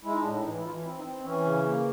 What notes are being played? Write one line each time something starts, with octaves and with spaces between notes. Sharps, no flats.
G#3 E4
D#4
D4
A2
D#4
E3 D#4
E4
E3 F4
C4 E4
D#4
C4
E3 C#4
C#3
A#3